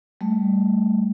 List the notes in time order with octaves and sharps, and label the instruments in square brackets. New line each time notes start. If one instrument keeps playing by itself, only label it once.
[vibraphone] G3 A3